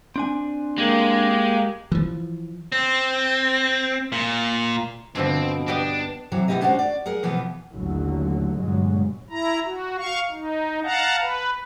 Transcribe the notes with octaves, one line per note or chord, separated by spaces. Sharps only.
C4 D4 G#5
G#3 A#3 G4
E3 F3
C4
A#2
G2 B2 D3 F3 C4
B3 D4 G4 D#5
C3 E3 F#3 E4
B2 D#3 E4 G4 D#5
G#3 C#4 D4 F4 F#4 C5
D5
G#4 A#4 F#5
B2 E3 F3 B3
A1 D#2 D3 F#3
G1 A#2 F#3 G#3
E4 A#5
F#4
F5 C#6
D#4
F5 F#5 A5 A#5
B4